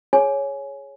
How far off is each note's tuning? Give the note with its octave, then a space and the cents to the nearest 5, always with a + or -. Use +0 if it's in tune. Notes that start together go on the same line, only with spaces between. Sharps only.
G#4 +0 C#5 +0 G#5 +15